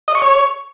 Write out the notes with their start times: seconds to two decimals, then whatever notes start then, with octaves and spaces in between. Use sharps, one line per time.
0.08 D#5
0.15 C#6
0.22 C#5